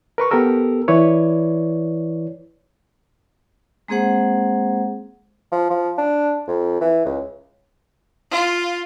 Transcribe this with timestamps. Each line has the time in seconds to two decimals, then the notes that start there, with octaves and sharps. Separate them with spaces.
0.18 A#4 B4 C#6
0.31 B3 G4 A4 A#4 E6
0.88 E3 E4 B4 C#5 D5
3.88 G#3 A#3 C4 G#4 C5 F#5
5.52 F3
5.70 F3
5.98 D4
6.47 F2
6.81 E3
7.05 C#2
8.32 F4